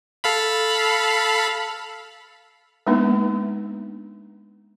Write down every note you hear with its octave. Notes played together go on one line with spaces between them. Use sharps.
A4 F5 B5
G#3 A#3 B3 D4 D#4 B4